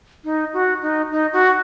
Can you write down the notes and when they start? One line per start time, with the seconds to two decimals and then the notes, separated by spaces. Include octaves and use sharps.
0.24 D#4
0.54 F#4
0.82 D#4
1.12 D#4
1.33 F#4